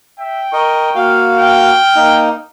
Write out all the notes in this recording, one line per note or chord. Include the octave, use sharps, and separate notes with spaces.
E5 G5
A#4 D#5 C#6
A#3 F#4 F5 F6
G5
A#3 D#4